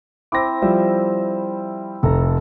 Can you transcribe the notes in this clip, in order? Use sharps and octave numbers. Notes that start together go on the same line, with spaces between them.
C4 E4 D6 A#6
F3 G3 E5
F1 A4 A#5